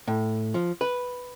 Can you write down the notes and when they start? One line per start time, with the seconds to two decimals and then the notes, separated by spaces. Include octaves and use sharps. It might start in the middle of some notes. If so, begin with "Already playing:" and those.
0.08 A2
0.54 F3
0.81 B4